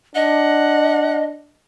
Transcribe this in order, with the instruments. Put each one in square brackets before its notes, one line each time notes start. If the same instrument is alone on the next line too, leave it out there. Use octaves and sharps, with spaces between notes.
[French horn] D4 [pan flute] D#5 [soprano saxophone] F#5